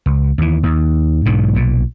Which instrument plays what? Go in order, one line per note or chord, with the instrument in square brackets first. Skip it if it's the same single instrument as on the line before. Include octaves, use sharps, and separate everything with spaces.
[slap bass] C#2
D#2 E3
D#2
B1 G#2 B2 D3
B1 A#2